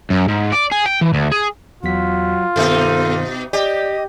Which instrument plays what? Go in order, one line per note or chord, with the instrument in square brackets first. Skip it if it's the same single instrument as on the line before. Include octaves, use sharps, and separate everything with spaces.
[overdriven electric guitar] F#2
G#2
D5
G#4
G5
E3
D2
G#4
[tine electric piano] E2 B6 [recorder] F#3 [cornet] F4
[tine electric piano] G2 D#3 B3 [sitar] B2 D#4 [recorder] A4
[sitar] G4 [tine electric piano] D5 [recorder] D#5